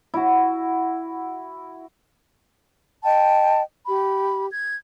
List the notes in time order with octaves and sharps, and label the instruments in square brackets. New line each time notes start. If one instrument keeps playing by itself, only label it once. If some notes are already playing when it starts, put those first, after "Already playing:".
[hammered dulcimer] E4 F#4
[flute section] D#5 G5 A5
G4 B5
G#6